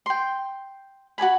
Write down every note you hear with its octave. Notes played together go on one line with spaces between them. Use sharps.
G5 C6
F#4 A#4 G#5 B5